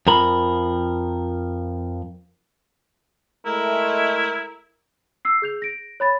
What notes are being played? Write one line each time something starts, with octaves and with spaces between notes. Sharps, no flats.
F2 F3 A#4 B5
G#3 A3 E4 A#4
E6 C7
G#4 G6 F7
A#6 D7
C#5 B5 A6